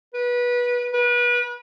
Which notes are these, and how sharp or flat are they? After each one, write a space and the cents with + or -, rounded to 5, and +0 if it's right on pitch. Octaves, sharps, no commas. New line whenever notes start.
B4 -20
B4 -30